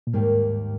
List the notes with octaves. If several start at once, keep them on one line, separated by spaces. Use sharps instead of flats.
A#2
D#2 G#2 D#3 G3 A#3